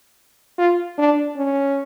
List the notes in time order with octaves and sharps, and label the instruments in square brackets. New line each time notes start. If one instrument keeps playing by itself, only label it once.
[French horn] F4
D4
C#4